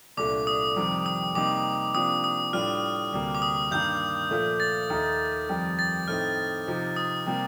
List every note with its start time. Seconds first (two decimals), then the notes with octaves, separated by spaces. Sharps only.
0.17 C2 A#2 A3 D4 D6
0.47 D#6
0.76 F2 C3 D#3 G3
1.06 D#6
1.35 C3 G3 A#3 D#4 D6
1.95 C3 F3 A#3 D4 D#6
2.24 D#6
2.53 A2 G3 D4 F4 F6
3.13 D2 C3 G3 A#3
3.35 D6
3.42 D#6
3.71 G2 D#3 A#3 G6
4.31 A#2 F3 A3
4.60 A6
4.90 D#2 D#3 A3 D#4
5.49 F2 D#3 G3
5.79 A6
6.08 A2 A3 C4 D#4 F6
6.67 C3 F3 C4 D#4
6.96 D#6
7.26 C3 G3 A#3